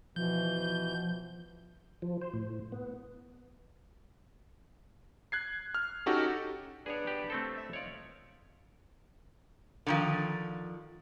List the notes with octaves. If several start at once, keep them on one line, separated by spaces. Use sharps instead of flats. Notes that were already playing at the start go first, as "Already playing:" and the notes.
B2 E3 F3 G6
F3
C5
A2
B3
F#6 G#6 C7
F6
C#4 D#4 F#4 G4 A4
B3 D4 G#4 C#5
G4 B4
A3 C4 A4
E5
C#4 D#4 F4 C#5 D5
D3 D#3 F3